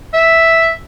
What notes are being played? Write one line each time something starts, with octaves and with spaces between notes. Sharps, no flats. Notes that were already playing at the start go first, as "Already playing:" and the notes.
E5